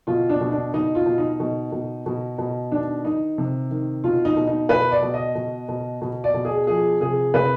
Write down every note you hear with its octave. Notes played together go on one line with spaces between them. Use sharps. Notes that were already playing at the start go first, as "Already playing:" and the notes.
B2 F4
D4
B2
D4
B2 D#4
F4
B2
D#4
B2
B2
B2
B2
D#3 D4
D#3 D#4
C3
D#3
B2 F4
D#4
B2
D#4
B2 B4
D5
B2
D#5
B2
B2
B2
D5
B2
G#4
F3 G#4
C3 G#4
C3 B4